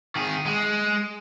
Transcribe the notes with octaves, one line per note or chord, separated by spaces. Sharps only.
D#3 G#4
G#3